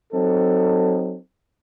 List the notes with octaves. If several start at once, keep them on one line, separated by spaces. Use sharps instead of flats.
F#3 C4 D#4 A4